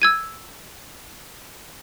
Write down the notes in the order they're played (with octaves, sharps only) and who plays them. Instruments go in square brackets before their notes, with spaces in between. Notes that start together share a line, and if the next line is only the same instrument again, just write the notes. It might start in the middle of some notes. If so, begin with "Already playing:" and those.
[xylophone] E6 G#6 D#7